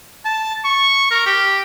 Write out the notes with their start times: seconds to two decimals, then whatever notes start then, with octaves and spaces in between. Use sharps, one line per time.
0.25 A5
0.65 C#6
1.11 A#4
1.26 G4